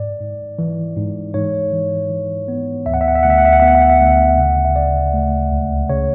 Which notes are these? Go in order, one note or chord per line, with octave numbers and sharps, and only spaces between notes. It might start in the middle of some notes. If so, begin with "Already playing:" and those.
Already playing: G#2 D5
G#2
E3
G#2
G#2 C#5
E3
E3
B3
D2 E5
F#5
E5
F#5
E5
D2 F#5
E5
F#5
E5
F#5
B3 E5
F#5
E5
F#5
E5
D2
C#3 F#5
E5
C#3 D5
A3
C#2
C#3 C#5